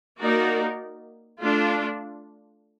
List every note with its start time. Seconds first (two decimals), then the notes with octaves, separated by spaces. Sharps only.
0.19 A#3 D#4 F#4 A#4 D5
1.41 A3 D4 F4